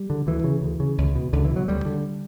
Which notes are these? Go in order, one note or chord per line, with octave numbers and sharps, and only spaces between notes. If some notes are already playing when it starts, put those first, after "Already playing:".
Already playing: G3
D3
D2 E3
C#3
D2
C#3
C#2
B2
C#2 D3
E3
B2 F#3
D2 G3
D3